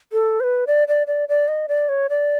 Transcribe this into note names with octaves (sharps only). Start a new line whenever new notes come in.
A4
C5
B4
D5
D5
D5
D5
D#5
D5
C#5
D5